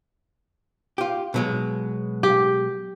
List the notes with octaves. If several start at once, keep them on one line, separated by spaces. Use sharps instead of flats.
F4 G4
B2 F#3 G#3
G4